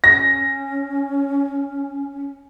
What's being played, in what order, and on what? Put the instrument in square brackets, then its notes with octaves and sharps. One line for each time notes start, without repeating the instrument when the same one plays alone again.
[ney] C#4 [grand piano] A#6